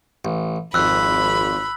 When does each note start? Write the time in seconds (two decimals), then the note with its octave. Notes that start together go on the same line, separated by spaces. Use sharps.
0.25 A1
0.74 G#1 F2 B5 E6 F#6